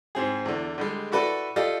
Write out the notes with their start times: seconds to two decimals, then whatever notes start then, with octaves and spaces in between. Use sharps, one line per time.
0.15 G#2 C4 G#4
0.45 E2 D3
0.78 D3 G3 G#3
1.12 E4 F#4 A4 B4 D5
1.56 F4 G4 A4 D5 D#5